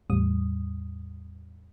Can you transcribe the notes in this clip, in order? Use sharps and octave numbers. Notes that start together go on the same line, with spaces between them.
A1 E2 A2 G3 D#6